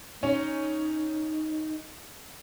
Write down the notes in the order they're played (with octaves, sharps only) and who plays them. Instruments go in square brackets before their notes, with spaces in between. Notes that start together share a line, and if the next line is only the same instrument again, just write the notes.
[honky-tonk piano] C#4 [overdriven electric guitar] D#4